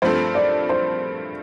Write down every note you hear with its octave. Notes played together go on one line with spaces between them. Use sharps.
G2 F3 A3 C4 C5
D5
C5